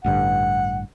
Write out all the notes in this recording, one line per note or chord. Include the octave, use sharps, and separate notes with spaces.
A1 G2 D3 F#5